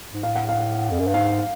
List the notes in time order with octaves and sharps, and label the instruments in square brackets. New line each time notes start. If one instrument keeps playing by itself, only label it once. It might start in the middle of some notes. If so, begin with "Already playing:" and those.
[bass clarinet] G#2
[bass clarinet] A2 [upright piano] F5
[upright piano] F#5
F5
[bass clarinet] F2
F#2
G2
[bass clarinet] G#2 [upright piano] F5